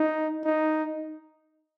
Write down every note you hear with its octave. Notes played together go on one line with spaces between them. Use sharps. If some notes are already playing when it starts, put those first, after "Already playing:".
Already playing: D#4
D#4